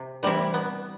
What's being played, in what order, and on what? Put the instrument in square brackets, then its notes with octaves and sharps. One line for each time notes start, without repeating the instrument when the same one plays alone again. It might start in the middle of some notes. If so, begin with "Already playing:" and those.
Already playing: [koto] C3
E3 G3 C4 E4
B3